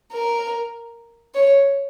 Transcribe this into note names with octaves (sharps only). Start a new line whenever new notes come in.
A#4
C#5